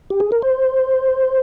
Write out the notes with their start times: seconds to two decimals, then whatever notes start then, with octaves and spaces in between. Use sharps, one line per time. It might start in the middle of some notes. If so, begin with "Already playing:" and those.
0.10 G4
0.20 G#4
0.32 A#4
0.42 C5